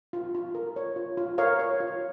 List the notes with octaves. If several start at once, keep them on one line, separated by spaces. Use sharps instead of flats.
F4
F4
A#4
C#5
F4
F4
A#4 C#5 F5
C#5
F4